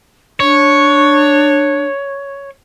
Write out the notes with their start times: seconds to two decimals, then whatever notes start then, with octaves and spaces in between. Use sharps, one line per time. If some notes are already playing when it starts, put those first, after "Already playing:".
0.40 D4 C#5